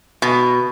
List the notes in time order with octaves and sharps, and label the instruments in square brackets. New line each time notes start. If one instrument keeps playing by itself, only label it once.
[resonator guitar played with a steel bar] B2